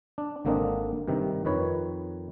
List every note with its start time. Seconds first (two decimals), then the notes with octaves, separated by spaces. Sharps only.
0.18 D4
0.45 G#1 D3 A#3 C4 D4 D#5
1.08 G2 C3 D#3
1.45 F2 D#3 B4 C#5